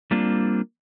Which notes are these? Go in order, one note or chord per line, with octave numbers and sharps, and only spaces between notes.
G3 A#3 C4 D4 F4